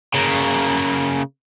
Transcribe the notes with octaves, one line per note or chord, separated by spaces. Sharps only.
C#3 A#3